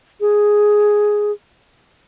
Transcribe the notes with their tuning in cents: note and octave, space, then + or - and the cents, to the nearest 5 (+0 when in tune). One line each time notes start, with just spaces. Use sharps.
G#4 +0